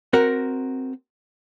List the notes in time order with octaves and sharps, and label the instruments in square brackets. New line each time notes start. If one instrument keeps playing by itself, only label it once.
[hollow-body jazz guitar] C4 F#4 A#4 F#5